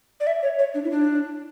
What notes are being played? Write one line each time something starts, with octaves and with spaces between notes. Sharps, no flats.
D5
E5
C#5
C#5
D4
E4
D4